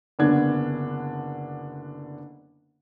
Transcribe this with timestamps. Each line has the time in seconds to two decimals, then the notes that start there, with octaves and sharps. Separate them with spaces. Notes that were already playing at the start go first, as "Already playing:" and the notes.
0.19 F#1 D3 B3 D4 G#6